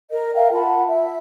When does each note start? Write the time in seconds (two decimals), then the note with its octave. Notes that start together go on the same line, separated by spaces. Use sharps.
0.11 A#4 D#5
0.35 A#4 E5 F5 G5
0.53 F4 F#5 A5 B5
0.88 E5